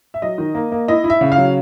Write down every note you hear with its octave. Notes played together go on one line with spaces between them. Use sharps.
E5
F#3 D#5
D#3
A#3
A#3
E4 D#5
E4
E5
C#3
F5
F#3